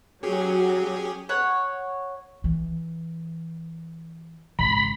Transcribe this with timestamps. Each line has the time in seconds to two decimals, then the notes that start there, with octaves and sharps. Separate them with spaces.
0.23 F#3 C#4 G4 G#4
1.29 C#5 F#5
2.44 E3
4.59 G#1 C#3 B5